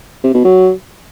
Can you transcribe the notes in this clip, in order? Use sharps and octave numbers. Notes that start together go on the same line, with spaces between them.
C3
B2
F#3